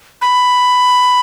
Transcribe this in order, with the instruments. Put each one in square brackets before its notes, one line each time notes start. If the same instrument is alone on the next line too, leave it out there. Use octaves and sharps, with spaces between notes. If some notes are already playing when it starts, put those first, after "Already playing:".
[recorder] B5